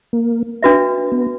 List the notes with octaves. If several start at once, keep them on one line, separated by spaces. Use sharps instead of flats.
A#3
D4 F#4 B4 E5
B3